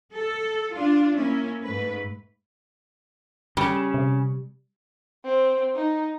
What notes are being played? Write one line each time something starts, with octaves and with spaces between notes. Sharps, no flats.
A4
D4 F4
A#3 C#4 E4
G#2 A3 B4
C#3 G3
C3
C4
D#4